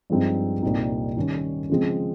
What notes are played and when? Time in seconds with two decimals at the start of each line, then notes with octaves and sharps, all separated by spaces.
0.10 G2 F3 G#3 C4 D#4
0.62 C2 A#2 G3 C4 D#4
1.17 D#3 G3 C#4
1.70 C#3 F3 G#3 C4